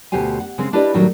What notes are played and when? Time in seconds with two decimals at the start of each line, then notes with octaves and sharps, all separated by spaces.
0.12 D2 B2 G4 C5 G#5
0.40 F#5
0.58 C#3 G#3 C4
0.73 D4 E4 G4 B4 D5 D#5
0.94 A2 D#3 F#3 G3